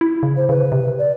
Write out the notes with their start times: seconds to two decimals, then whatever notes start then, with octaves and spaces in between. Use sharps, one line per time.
0.01 E4
0.23 C#3
0.37 C5
0.49 C#3 B4
0.72 C3
0.98 D5